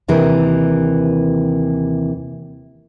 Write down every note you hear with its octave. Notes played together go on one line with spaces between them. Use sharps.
D#2 C3 E3 A#4